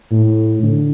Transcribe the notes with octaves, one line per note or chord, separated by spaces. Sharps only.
A2
D3